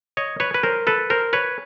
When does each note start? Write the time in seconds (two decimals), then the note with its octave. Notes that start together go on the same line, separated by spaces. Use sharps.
0.17 C#5 D#5
0.40 B4 C#5
0.54 B4
0.63 A#4 C5
0.87 A4 B4
1.10 A#4 C5
1.33 B4 C#5